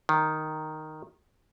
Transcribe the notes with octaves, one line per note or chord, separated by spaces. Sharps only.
D#3